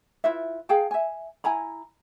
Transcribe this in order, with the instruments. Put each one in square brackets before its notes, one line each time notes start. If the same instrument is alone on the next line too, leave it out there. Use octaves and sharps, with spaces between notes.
[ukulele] E4 F4 B4 E5
G#4 F5 G5 A5
E5 G#5
E4 G#5 A#5 B5